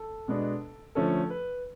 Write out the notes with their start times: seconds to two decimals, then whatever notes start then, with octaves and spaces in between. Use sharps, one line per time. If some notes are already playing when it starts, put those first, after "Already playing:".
Already playing: A4
0.28 B2 G#3 B3 D4
0.95 D3 F3 A3 C#4 A4
1.30 B4